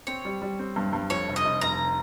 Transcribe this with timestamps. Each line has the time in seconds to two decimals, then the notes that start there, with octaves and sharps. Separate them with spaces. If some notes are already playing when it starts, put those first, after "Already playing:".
0.07 C4 C#5
0.25 G3
0.42 G3
0.59 C4
0.76 G2
0.93 G2
1.10 F2 C#5
1.28 F1
1.36 D#5
1.45 F1
1.61 F1 A#5